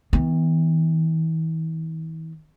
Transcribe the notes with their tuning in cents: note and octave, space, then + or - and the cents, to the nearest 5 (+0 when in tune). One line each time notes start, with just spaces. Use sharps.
E3 -40 B3 +5